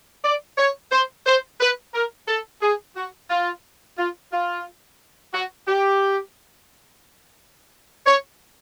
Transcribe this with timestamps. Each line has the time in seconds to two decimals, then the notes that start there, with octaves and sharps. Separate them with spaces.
0.24 D5
0.58 C#5
0.92 C5
1.26 C5
1.61 B4
1.94 A#4
2.28 A4
2.62 G#4
2.96 F#4
3.30 F4
3.98 F4
4.33 F4
5.34 F#4
5.68 G4
8.06 C#5